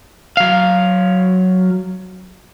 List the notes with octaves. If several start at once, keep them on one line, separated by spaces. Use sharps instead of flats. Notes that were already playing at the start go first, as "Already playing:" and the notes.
F#3 F5